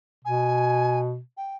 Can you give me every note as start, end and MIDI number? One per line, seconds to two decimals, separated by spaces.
0.25 1.19 47
0.25 0.98 80
1.37 1.56 79